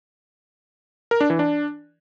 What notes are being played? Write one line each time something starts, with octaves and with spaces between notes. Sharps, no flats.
A#4
D4
E3
D4